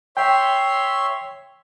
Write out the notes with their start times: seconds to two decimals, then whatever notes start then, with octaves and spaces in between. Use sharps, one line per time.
0.17 C#5 E5 G5 C6